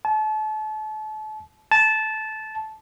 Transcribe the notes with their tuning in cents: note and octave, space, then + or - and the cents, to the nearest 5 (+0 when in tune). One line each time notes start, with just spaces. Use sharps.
A5 -35
A5 -15